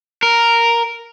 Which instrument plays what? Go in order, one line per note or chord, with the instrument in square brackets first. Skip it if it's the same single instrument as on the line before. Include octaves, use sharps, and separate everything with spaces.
[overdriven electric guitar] A#4